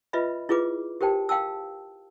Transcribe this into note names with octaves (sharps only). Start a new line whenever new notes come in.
F4 B4 D#5 E5 B5
E4 F4 G#4 B4 D6
G4 A#4 C5 G5 A5
F5 G5 A5 E6